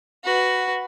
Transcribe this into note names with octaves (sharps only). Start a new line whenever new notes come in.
F#4 B4